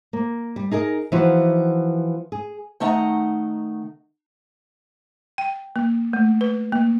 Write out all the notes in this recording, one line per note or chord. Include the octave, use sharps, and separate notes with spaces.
A#3
G3
D#4 G#4 A#4 D#5
E3 F3 B3 D#4 F4 F#4
G#4
D#3 A3 D#4 F#5 G#5 A#5
G5
A#3
A3
B4
A#3